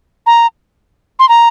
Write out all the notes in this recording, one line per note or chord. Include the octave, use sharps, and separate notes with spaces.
A#5
C6
A#5